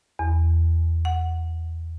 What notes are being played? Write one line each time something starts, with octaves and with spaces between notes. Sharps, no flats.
E2
F#5